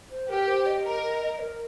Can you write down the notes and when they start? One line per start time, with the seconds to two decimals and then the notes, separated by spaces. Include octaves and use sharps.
0.11 C5
0.29 G4 A#4
0.48 C5
0.66 D#5
0.84 A#4
1.40 A#4